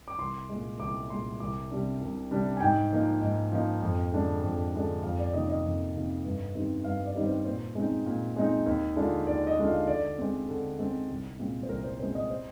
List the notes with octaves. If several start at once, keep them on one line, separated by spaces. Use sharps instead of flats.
D6
C2 C6
A#2 G#3
C2 D6
A#2 G#3 C6
C2 D6
C3 G3 D4
C2
C3 G3 D4
G#5
G#2 G5
F3 A#3 D#4
G#2
F3 A#3 D#4
F2
D3 G#3 D4
F2
D3 G#3 D4
F2 F5
D5
C3 D#3 A#3 D#5
D#5
F2
C3 D#3 A#3
G2
D#3 G3 C4 D#4
G2 F5
D5
D#3 G3 C4 D#4
C5
A#2 C5
G#3 C4 D#4
A#2
G#3 C4 D#4
D#2
D3 G#3 D4 F4
D#2 D5
D#5
D3 G#3 D4 F4
F5
D3 D5
G#3 C4
D3
G#3 C4
C2
A#2 G#3 C4
C5
C2 A#4
C5
A#2 G#3 C4 C5
D#5
C5